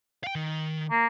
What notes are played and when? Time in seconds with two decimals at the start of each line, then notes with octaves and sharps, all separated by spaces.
0.24 F5 G5
0.35 D#3
0.91 A#3